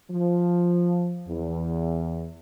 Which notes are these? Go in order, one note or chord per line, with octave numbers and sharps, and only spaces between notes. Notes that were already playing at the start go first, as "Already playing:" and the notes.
F3
E2